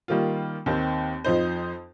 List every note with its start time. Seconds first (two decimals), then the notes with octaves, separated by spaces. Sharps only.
0.08 D#3 G3 A#3 F4
0.66 D#2 D#3 C4
1.24 F2 F3 D#4 C5